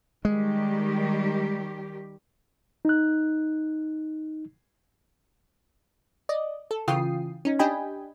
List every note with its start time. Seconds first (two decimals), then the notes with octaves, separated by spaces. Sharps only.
0.25 D#3 G3 G#3 G4
2.85 D#4 F#6
6.29 D5 D#5
6.71 A4
6.88 C#3 E3 F4 G5 D#6 C7
7.45 C#4 D#4
7.59 D4 G4 D#5 G5 G#5 B5